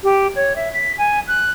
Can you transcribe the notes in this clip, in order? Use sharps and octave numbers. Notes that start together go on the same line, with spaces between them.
G4
C#5
E5
B6
G#5
F#6